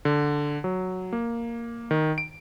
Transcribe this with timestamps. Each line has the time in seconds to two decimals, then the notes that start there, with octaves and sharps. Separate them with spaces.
0.05 D3
0.64 F#3
1.13 A#3
1.91 D#3
2.18 D7